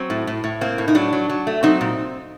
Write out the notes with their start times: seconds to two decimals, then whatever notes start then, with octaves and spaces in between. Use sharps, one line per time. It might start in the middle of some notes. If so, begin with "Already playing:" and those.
Already playing: F#3 C4
0.10 A2
0.27 A2
0.44 A2
0.61 A#3 C4
0.78 A2
0.88 D#4
0.95 F#3 D4
1.13 F#3
1.29 F#3
1.47 A3
1.63 F#3 C4 D#4
1.81 A#2